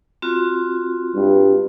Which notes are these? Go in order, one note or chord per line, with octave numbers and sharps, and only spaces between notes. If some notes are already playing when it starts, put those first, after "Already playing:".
C4 F4 F#4
G2